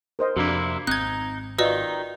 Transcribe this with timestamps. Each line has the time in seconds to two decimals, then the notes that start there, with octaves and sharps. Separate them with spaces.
0.19 A#4 C5 D#5
0.36 F2 C3 A#3 D4 E4 F#4
0.87 G#1 C4 D#4 F#6 G#6
1.59 D#3 D#4 F4 F#4 B4 D5 D#5 E6